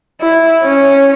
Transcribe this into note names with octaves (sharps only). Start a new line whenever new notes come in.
E4
C#4